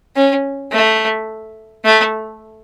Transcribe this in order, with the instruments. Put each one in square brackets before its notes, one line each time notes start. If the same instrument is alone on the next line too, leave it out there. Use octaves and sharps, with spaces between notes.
[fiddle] C#4
A3
A3